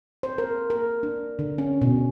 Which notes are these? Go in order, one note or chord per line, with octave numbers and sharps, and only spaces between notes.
C5
A#4
A#4
D4
D3
C#4
B2